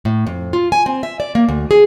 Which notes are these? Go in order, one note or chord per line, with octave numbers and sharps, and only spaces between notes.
A2
F2
F4
G#5
C4
E5
D5
A#3
D2
G#4